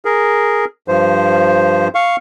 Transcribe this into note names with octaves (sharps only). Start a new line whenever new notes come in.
G#4 A#4
G2 F3 C5
F5 C#6